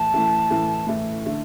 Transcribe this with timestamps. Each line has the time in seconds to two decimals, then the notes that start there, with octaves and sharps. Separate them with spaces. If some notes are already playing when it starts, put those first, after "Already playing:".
Already playing: A2 E3 A3 A5
0.14 A2 E3 A3
0.50 A2 E3 A3
0.86 A2 E3 A3
1.25 D3 A3